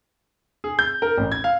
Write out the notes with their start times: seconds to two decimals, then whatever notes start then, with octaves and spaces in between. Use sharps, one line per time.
0.64 G#4
0.79 G6
1.02 A#4
1.17 A1
1.32 G#6
1.44 F5